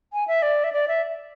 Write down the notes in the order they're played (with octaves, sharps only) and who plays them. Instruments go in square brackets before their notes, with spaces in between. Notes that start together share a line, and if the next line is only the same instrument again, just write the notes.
[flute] G#5
E5
D5
E5
D5
E5